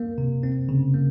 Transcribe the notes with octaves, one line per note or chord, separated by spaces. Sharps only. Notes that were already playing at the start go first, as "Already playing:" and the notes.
Already playing: A#3
C3
C4
C#3
A#3